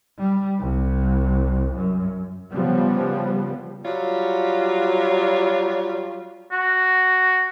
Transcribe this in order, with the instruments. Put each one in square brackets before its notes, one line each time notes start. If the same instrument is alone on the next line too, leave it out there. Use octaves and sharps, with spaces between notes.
[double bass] G3
C2
F#2
[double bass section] C#3 F3 G3 B3
[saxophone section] F#3 G3 F4 C#5
[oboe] F#4